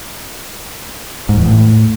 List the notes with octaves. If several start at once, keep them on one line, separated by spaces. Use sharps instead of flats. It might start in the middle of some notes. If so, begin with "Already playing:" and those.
G#2
E2
A2